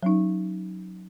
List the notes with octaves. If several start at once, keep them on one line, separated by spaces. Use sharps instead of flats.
F#3 C#4 D#4